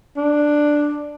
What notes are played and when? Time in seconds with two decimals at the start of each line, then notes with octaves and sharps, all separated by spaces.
0.17 D4